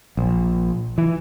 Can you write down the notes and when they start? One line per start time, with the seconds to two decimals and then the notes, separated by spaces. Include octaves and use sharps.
0.17 A#1
0.98 E3